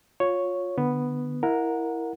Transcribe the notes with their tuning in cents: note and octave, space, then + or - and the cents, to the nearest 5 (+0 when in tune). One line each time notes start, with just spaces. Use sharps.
F4 +25 C#5 +0
D3 +15 B3 +0
E4 +0 A#4 +0 F#5 -25